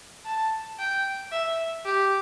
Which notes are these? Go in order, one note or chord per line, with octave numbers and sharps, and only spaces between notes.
A5
G5
E5
G4